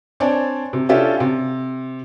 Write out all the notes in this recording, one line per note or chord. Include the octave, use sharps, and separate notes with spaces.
C4 D4 C#5 D5 G#5 A5
C3
C#4 D4 F4 G4 A4 E5
C3